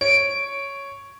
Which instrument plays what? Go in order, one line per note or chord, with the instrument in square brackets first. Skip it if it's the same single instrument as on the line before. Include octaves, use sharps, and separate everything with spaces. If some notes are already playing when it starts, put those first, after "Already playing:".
[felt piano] C#5 [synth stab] D7